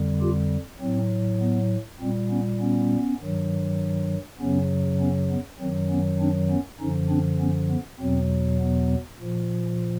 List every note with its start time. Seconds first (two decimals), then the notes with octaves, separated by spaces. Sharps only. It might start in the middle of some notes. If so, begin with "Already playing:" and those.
Already playing: F2 D3 G3
0.21 F4 G4
0.81 A2 F#3 C4
1.41 B3
2.00 A#2 G3 C4
2.30 B3 C#4
2.60 B3 C#4
3.21 G2 D#3 F#3
4.40 F#2 C#3 F#3 B3 C#4
5.00 B3 C#4
5.30 B3
5.60 F#2 D#3 F#3 C4
5.90 B3 C#4
6.20 C4 D4
6.50 B3 C#4
6.80 F#2 D3 F3 C#4 D#4
7.10 C4 D4
7.40 B3 C#4
7.70 B3
8.00 E2 B2 F#3 C4
8.59 B3
9.20 A#2 F3